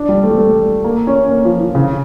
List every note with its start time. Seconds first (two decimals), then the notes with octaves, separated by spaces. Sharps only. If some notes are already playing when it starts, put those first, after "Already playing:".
Already playing: D4
0.09 G3
0.24 A3
0.31 G3
0.37 A3
0.84 A#3
1.07 C#4
1.29 A#3
1.45 F3
1.60 E3
1.75 C#3